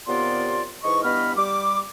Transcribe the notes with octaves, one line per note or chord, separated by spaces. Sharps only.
D#2 C3 B3 F4 D5 C6
G#2 E3 D#5 C#6
G2 E3 B3 D#5 B5 F6
G3 D6